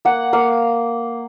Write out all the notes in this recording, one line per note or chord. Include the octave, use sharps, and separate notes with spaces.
A#3 F#5
A#3 F5